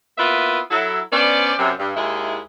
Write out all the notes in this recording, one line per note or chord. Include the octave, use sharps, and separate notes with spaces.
A#3 B3 E4 F4 B4 E5
F#3 E4 A4
B3 C#4 D4 C5 D5
F#2 C3
G2
D#2 G#3 E4